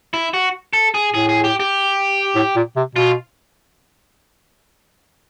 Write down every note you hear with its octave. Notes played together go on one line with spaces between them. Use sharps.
E4
F#4
A4
G#4
A2 G#4
G#4
G4
G4
A2
A#2
C3
B2 F4